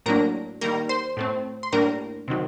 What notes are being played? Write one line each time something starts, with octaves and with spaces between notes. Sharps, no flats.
A2 F#3 A#3 D4 A#4 A#5
D#3 G3 A#3 A#4 A#5
C5 C6
A2 A3 C4
C6
A2 G3 A#3 D4 A#4 A#5
C3 D#3 F#3